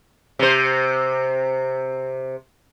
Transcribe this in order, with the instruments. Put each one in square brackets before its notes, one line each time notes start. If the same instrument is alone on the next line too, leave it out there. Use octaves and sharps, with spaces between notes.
[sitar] C3 C5